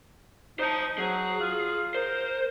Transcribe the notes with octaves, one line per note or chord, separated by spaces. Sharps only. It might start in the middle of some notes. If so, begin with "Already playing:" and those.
D#4 C5 A5
F#3 G#4
F4
A#4 C5